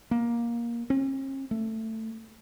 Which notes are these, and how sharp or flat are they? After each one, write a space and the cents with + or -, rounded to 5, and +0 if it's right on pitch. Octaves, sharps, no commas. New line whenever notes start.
A#3 +15
C#4 -45
A3 +15